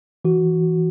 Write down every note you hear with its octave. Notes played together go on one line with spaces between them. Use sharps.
E3 F#4